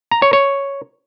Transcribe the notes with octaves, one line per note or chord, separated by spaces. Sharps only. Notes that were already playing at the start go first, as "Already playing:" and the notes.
A#5
C#5
C#5